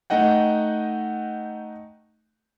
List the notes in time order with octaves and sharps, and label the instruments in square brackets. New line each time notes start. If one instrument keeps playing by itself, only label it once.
[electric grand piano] A3 D#4 D#5 F#5 G5